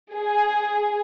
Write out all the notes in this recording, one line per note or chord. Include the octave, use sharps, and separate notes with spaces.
G#4